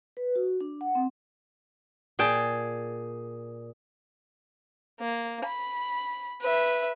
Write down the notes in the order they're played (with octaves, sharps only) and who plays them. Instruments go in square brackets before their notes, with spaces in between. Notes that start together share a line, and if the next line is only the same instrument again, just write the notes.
[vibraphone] B4
F#4
D4
F#5
C4
[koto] A#2 G#4 G5 A5
[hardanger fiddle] A#3
B5
B4 E5